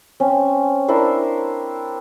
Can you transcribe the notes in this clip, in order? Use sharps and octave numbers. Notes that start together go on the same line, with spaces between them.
C4 C#4
D4 E4 A#4 C5